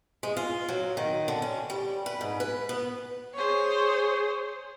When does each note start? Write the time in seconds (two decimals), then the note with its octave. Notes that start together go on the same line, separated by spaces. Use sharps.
0.23 G#3
0.37 F4
0.69 F#3
0.97 D#3
1.28 D3
1.42 C#4
1.70 G3
2.06 B4
2.21 G#2
2.40 B4
2.69 B3
3.35 G#4 C5 C#5